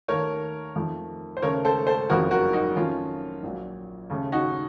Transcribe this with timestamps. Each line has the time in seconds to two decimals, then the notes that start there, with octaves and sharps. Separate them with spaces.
0.08 D#2 D#3 A3 A#4 C#5
0.76 F2 D#3 A3
1.37 C5
1.42 D#2 C#3 A3 A#4 C#5
1.65 A4 C5
1.87 A4 C5
2.09 F#1 F2 C#3 F#4 A#4
2.31 F#4 A#4
2.53 D#4 F#4
2.76 F2 D#3 A3 C#4 F4
3.43 A#1 A#2 F#3
4.10 D#2 C#3 A3
4.32 D#4 F#4